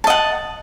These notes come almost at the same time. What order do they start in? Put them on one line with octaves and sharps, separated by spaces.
A5 D#5 F#5